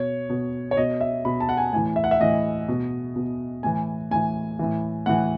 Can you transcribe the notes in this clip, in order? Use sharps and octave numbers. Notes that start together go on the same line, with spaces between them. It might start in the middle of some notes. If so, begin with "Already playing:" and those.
Already playing: B2 C#5
B2
C#5
B2 D#5
E5
B2 B5
A5
F#5
G#5
A2 E3 G#5
E5
F#5
E5
A2 E3 D#5
B2
B2
A2 E3 G#5
A2 E3 G#5
A2 E3
A2 E3 F#5